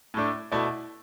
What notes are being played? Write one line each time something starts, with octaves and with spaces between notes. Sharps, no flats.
A2 A3 D4
B2 A3 E4 D5